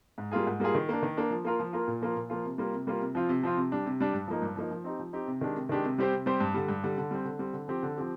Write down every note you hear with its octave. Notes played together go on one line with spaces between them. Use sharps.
G#2
G3 A#3 F4 G#4
G#2
G3 A#3 F4 G#4
D#3
A#3 D4
D#3
A#3 D4
F3
A#3 F4 A#4
F3
A#3 F4 A#4
A#2
F3 A#3 F4
A#2
F3 A#3 F4
C3
G3 A#3 F4
C3
G3 A#3 F4
C3
F3 C4 F4
C3
F3 C4 F4
C3
G3 D4
C3
G3 D4
G2
F3 A#3 D#4
G2
F3 A#3 D#4
F3
C4 D#4 G4
F3
C4 D#4 G4
C3
D#3 G#3 D4 G4
C3
D#3 G#3 D4 G4
C3
G3 C4 G4 C5
C3
G3 C4 G4 C5
G2
D3 G3
G2
D3 G3
D3
G3 C4
D3
G3 C4
D3
F3 C4 G4
D3
F3 C4 G4